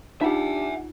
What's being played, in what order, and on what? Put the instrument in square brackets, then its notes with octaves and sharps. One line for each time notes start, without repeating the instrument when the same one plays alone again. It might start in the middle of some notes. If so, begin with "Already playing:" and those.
[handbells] D4 G4 [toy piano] D#4 F4 [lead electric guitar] E5 F#5